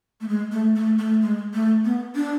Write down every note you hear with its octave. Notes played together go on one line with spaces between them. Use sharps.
A3
G#3
A3
A3
A3
G#3
A3
B3
D4